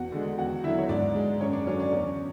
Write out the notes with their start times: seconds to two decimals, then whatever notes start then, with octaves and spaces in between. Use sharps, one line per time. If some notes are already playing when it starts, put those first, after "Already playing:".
Already playing: E2 F#4 F#5
0.12 D3 G#3
0.38 E2 F#4 F#5
0.63 D3 F#3 E4 E5
0.79 C#5
0.89 G#2 D4 D5
1.15 G#3
1.41 F#2 C#4 C#5
1.53 D4 D5
1.66 D3 F#3 C#4 C#5
1.79 D4 D5
1.92 E2 C#4 C#5